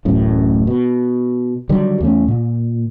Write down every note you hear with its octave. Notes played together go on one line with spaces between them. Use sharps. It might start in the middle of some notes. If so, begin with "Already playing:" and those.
D1 A1 F#2 A2
B2
D3 D#3 F#3 G3
E2 G2 A3 C#4
A#2